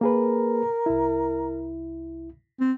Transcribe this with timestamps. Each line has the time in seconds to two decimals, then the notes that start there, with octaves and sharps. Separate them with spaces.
0.01 A#3 G#4 A#4 B4
0.86 C2 E4
2.60 C4